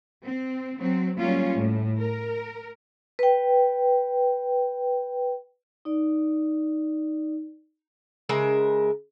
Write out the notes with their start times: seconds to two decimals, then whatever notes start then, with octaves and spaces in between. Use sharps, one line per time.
0.24 C4
0.79 F#3 C4
1.17 F#3 G3 A#3 C#4 F4
1.56 A2
1.98 A#4
3.19 B4 G5
5.85 D#4 D5
8.29 C#3 G#3 A#4 E5